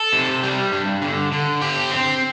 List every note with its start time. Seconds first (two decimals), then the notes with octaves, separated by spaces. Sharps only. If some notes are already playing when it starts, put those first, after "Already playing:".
Already playing: A4
0.13 C3
0.43 G3
0.72 G2
1.02 D3
1.32 D3
1.62 G4
1.91 C4